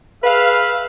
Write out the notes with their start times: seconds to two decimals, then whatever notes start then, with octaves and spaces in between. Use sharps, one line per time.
0.23 G#4 B4 E5 F5